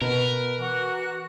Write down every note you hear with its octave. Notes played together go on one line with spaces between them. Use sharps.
B2 A#4 B4
E3 F#4 F#6